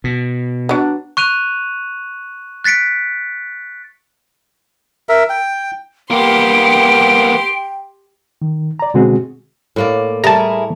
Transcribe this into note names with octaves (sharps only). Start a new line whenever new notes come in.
B2
F#3 B3 D4
C#6 F#6 D#7 F7
F#6 A6 B6 C#7 D7
A#4 E5
G5
A#3 B3 G4 G5 C6 D7
D#3
D5 A#5
B2 D3 G#3 C4 F#4 G#4
A2 A#3 D5
G3 A3 E4 G#4 A#4 A5 A#5